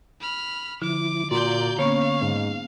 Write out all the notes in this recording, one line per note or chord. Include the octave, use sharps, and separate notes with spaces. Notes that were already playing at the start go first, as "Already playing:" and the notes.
B5 F6
D3 F3 E4 D6
A#2 F#4 D5 A#5 C6 G6
D3 A#3 B3 C#4 C#5 F5
G#2